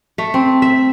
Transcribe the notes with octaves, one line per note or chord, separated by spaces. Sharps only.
A3
C4
E5